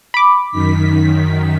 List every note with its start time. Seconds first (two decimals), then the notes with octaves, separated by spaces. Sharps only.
0.14 B5 D6
0.51 F#2 D#3 B6